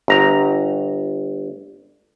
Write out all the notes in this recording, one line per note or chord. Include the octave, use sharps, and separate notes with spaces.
G1 A#5